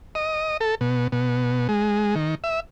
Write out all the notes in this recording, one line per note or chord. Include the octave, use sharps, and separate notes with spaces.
D#5
A4
B2
B2
G#3
D#3
E5